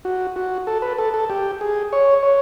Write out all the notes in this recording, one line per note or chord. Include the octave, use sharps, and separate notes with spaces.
F#4
F#4
A4
B4
A4
A4
G4
G#4
C#5
C#5